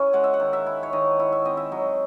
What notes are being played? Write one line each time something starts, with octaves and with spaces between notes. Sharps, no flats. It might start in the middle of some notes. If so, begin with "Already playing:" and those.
Already playing: C#4 E4 G#5
G#3 F#5
E5
F#5
D#3
E5
E4
C#5
D#3 D#5
E4
E5
C4 D#5
E5
F#3 D#5